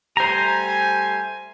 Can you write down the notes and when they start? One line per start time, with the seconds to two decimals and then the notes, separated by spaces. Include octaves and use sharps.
0.17 G3 A3 C5 G#5 A#5